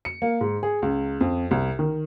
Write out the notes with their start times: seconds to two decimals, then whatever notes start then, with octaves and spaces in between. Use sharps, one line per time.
0.05 C#7
0.22 A#3
0.41 G#2
0.63 G#4
0.82 C#2
1.21 F2
1.51 C2
1.79 D#3